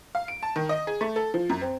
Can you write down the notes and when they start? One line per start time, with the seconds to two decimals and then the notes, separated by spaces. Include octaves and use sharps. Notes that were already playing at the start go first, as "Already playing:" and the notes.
0.15 F5
0.28 D7
0.43 A5
0.56 D#3
0.69 D#5
0.87 G#4
1.01 A3
1.16 A4
1.34 F3
1.49 F#2
1.61 C4